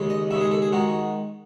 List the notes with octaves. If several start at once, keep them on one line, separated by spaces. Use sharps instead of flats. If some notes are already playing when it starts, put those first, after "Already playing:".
Already playing: D#2 C#3 G#3
D#5
D#2 C#3 G#3 E5
G#4
A4
G#4
D#3 G#3 F#4